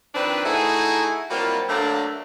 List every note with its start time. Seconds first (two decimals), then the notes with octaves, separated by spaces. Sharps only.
0.15 D#3 F3 C4 D4 B4
0.45 A3 D#4 E4 F#4 G#4
1.31 F#3 G3 A#3 C4 E4 F4
1.69 D3 F#3 A3 A#3 D4